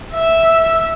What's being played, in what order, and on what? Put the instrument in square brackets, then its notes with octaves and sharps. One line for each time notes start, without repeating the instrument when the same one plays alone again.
[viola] E5